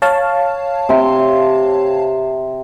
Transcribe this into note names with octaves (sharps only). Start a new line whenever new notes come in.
C#5 F5 A5
C3 C6